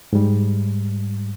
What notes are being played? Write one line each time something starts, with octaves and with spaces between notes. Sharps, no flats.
G#2 G3